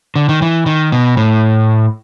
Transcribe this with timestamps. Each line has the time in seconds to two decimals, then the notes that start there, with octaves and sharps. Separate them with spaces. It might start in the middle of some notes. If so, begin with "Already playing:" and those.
0.16 D3
0.29 D#3
0.42 E3
0.66 D#3
0.92 B2
1.17 A2